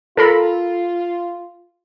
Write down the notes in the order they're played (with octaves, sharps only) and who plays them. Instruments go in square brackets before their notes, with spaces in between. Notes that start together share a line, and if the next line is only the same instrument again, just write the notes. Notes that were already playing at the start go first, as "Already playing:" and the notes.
[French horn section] F4 [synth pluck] A4 A#4 B5